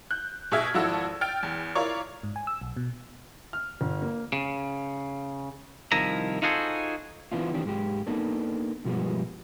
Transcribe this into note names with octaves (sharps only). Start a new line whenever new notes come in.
F#6 G6
B2 G#4 E5 F6 G#6
G#1 F3 E4 F#4 A4 E6
G5 F6 A6 D7
E2
E4 F4 A#4 C#5 D5 C#6
G#2
G#5
E6
B1
B2
F6
G1
A#3
C#3
C2 D#3 F3 E4 A#5
D#4 F4 F#4 G#4 A4 C5
E3 B3 C4 D4 E4 F4
D#3 E3 C4 D4 G4
G#2 G#3 G4
A#3 B3 D4 D#4 A4
G2 B2 F3 G3 G#3 B3